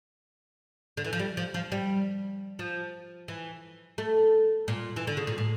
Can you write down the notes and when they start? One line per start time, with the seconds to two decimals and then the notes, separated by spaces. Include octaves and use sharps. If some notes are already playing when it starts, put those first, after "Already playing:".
0.97 D3
1.04 E3
1.13 F3
1.19 G3
1.37 F3
1.54 F3
1.72 G3
2.59 F3
3.28 E3
3.98 A3
4.68 A#2
4.96 E3
5.07 D3
5.17 C#3
5.27 A#2
5.38 A2